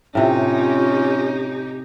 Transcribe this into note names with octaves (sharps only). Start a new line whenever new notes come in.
A2 C3 C#4 D#4 F4 G4